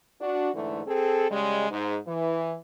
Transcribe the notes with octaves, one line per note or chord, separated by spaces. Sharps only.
D4 F#4
G#2 D3 E3 A3
C4 G#4 A4
C#3 G3 G#3
G#2
E3